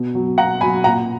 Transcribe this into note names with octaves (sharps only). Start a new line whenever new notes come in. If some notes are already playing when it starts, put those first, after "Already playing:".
Already playing: B2
F#3
B2 F#5 A#5
F#3 G#5 B5
A#2 F#5 A#5